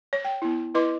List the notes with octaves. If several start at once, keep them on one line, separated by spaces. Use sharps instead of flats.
C#5
G5
B3 E4
E4 B4 D#5 C6 D6